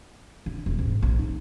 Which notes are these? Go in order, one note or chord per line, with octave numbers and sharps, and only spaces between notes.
D3
D#1
G#2
A#1
D#4